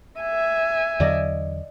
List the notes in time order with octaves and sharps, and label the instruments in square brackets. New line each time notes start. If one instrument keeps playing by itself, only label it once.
[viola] E5 G#5
[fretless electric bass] E2 D3 F#3 [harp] D5 D#5